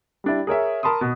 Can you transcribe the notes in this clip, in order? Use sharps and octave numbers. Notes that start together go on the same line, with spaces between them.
G3 D4 E4
G#4 A#4 C#5 E5
A#4 A5 B5 C6 D#6
B2